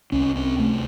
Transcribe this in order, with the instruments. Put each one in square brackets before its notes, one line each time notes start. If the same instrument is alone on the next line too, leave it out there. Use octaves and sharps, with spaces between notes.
[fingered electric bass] C2 C#4
C4
C2 A3